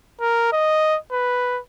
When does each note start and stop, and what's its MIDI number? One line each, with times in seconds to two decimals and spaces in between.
0.21 0.48 70
0.53 0.97 75
1.12 1.60 71